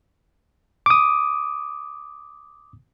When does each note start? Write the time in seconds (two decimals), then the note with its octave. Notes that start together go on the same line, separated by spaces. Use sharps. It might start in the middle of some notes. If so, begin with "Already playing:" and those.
0.86 D6 D#6